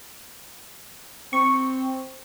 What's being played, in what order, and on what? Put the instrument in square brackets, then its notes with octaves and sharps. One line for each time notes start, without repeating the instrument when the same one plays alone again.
[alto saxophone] C4 [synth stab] C#6